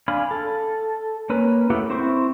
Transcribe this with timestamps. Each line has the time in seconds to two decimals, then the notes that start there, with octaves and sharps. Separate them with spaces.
0.08 D4 F5 G#5 B5
0.31 A4
1.30 A#3 C#4 B4
1.70 A3 B3 E4 G4 F#5
1.89 C4 E4 C5 G5 C#6